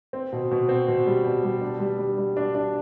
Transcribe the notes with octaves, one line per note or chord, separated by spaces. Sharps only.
C4
B2
B2
C4
B2
G3
B2
G3
D4
G3
G3
G3
D4
D4